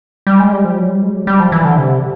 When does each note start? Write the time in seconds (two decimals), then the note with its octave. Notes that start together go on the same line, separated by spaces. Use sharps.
0.27 G3
0.40 G#3
0.52 G3
0.65 F3
0.77 F#3
0.89 G3
1.02 G#3
1.14 F#3
1.27 G3
1.40 F3
1.52 E3
1.65 D3
1.77 C3